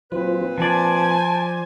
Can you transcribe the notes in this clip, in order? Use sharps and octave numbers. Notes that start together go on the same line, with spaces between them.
A#2 F#3 C4 F4 B4 C5
F3 C5 D5 G#5 A5